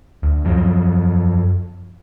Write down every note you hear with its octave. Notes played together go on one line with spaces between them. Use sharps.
D2
F#2 F3 F#3